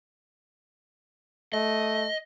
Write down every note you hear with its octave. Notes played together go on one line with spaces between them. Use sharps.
A3 D#5